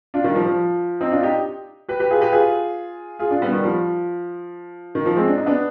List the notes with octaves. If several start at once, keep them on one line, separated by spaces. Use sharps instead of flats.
D4 F4
D#3 G3
F3
F3
C4 D#4
D4 F4
D#4 G4
G4 B4
G4 B4
F4 G#4
G4 B4
F4 G#4
F4 G#4
D4 F4
G3 B3
D#3 G3
F3
D#3
F3
G#3 C4
D4
D#4
B3 D4